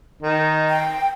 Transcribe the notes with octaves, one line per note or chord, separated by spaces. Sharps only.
D#3 D#4
G5